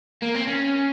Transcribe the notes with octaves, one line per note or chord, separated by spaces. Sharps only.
A#3
C4
C#4